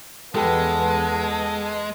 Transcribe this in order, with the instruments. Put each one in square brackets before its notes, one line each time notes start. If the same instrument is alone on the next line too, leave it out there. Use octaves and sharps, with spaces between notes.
[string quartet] E2 B3 [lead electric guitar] G#3 [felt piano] G4 A4 B4 [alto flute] A5